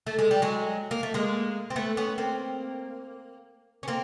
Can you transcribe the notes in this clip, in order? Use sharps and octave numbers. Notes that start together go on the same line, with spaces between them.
A3
G#3
G3
F#3 G#3
A#3
A3
G#3 A#3
C4
A3 B3
B3 C#4
A#3 C4
C#4
A#3 C4